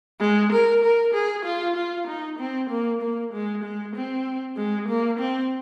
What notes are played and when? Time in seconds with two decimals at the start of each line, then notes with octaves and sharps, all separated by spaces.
0.20 G#3
0.52 A#4
0.83 A#4
1.14 G#4
1.45 F4
1.76 F4
2.07 D#4
2.39 C4
2.70 A#3
3.02 A#3
3.33 G#3
3.64 G#3
3.95 C4
4.57 G#3
4.88 A#3
5.19 C4